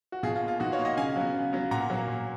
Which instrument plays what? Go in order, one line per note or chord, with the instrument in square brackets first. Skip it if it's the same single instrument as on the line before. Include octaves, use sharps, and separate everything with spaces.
[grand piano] F#4
B2 F4 G#4
F4
A#3
F4
B2 D#4 F#4
C#5 F5
A#3
D#5 F#5
C#3 F5 G#5
F#3 B3
C#3
F#3 B3
A#2 F#5 A#5
F#3 A#3
A#2